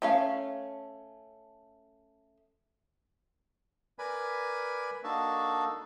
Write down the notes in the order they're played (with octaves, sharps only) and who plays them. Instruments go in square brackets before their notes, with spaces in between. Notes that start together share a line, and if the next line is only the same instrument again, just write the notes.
[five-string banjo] A3 C#4 F5
[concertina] A#4 B4 D5 G#5 B5
A#3 D4 D#4 F#4 A4 A5